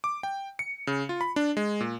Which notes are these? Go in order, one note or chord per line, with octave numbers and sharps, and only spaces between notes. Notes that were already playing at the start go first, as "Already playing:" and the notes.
D6
G5
C#7
C#3
F4
B5
D4
G#3
A#2